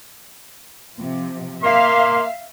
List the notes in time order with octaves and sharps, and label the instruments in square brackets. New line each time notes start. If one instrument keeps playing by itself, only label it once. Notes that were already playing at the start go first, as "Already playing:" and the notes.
[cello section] C3 F3
[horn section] A#3 C6 [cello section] E5 F5